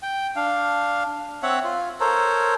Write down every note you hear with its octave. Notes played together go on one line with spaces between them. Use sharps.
G5
D4 F5
C4 C#5 E5 F#5
F4
A4 A#4 C5 C#5